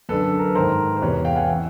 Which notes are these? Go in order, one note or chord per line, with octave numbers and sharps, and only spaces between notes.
F#2 D3 A4 B4
A#4
B4
G#2 D#3 A#4 C5
C5
E2 C3 E3 B4 C#5
F5 G5
F#5 G#5
E3 E5 F#5